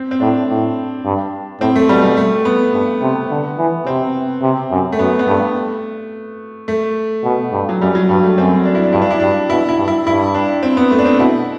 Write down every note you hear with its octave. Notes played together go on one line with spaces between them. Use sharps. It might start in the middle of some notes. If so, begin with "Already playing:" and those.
Already playing: C4
C4
A2 D4
A2
G2
A2 C4
A3
B2 G3
G3
A3
B3
G2
C3
D3
E3
C3 C4
C3
F#2
A3
F#2 B3
B3
G2 A3
A3
B2
G2
F#3
F#2 G3
F#3
G2 G3
A3
F#2 C4
D4
E4
D4
G2 E4
D4
E4
G2 D4
B2 E4
E4
G2
E4
G2 E4
D4
C4
B3
A3
D4
C4
B2 E4